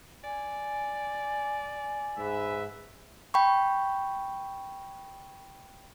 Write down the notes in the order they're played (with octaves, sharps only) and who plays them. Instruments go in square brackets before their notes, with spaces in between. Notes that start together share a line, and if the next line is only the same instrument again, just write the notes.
[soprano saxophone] D5 [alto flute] G#5
[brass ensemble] G#2 B4 E5
[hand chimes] G5 B5 C#6